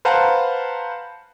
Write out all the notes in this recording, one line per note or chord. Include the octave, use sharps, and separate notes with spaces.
B4 C5 F5 F#5 A5 A#5